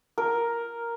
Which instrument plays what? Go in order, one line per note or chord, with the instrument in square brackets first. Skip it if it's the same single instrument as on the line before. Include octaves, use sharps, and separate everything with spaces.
[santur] A#4